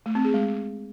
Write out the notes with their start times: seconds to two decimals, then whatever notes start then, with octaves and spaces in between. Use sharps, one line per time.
0.06 A3
0.15 C4
0.25 G#4
0.34 G#3